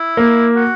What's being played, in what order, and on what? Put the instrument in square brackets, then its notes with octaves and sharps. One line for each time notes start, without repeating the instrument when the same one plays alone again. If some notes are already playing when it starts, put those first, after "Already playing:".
Already playing: [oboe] E4
[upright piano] A#3
[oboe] F#4